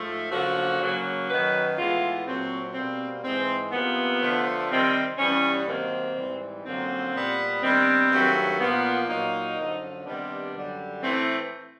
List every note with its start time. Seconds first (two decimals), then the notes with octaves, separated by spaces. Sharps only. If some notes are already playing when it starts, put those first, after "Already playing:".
Already playing: G#2 F3 A3
0.30 F#2 D3 F3 A#3 F#4
0.80 C#3 F#3 A#3
1.29 F#2 D#3 F#3 B4
1.77 A2 E3 G#3 B3 F4
2.26 A#2 F#3 A3 C4
2.74 B2 G3 A#3 C4
3.23 G#2 E3 G#3 C4
3.72 C3 F3 A#3 B3
4.21 D3 F3 A3
4.70 C3 D#3 G3 C4
5.18 G2 E3 G3 B3 C#4
5.67 C3 D#3 F#3 A#3 C4
6.16 G#2 E3 G3
6.64 F#2 D3 F3 A#3 C4
7.13 A#2 G3 B3
7.61 G2 D#3 G3 B3 C4
8.10 G2 D#3 F#3 A3
8.60 A#2 F3 A#3 B3
9.08 A#2 F#3 A#3 D#4
9.57 F#2 D3 F3
10.06 C3 D#3 G3 B3 D4
10.55 F#2 D3 G3
11.03 A2 E3 A3 C4